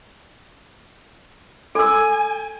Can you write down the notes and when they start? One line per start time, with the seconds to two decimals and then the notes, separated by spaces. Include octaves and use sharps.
1.75 A4 G#5 E6